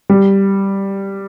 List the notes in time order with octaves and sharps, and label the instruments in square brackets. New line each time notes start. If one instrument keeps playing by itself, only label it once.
[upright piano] G3